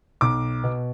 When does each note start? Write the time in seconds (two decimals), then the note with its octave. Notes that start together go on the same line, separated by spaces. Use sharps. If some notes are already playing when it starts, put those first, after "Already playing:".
0.21 B1 D6
0.64 B2